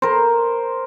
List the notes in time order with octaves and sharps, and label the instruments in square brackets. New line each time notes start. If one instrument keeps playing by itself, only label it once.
[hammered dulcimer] A#4 C5